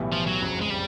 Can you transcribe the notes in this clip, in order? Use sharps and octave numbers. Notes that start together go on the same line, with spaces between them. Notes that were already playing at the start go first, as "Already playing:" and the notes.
Already playing: B1 A2 E3 G3 B3
F3
F#3
F#1 F2 C#3
G#3
G3